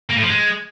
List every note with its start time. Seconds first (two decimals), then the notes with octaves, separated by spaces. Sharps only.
0.09 A#3
0.16 A2
0.22 F3
0.29 G#3